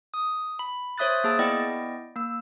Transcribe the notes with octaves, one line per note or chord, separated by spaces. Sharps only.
D#6
B5
C5 C#5 E5 D#6 F#6 A6
A#3 G#4 A5 A6
B3 E4 D5 D#5 G5
A#3 E6